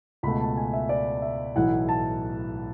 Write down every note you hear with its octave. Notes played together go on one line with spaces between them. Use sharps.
C#2 B2 A3 B5
A5
G#5
E5
D5
E5
B1 A2 E3 F#5
A5